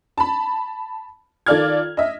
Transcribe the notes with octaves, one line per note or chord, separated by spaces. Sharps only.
A5 B5
D#3 F4 A4 D5 F6 G#6
D#5 E5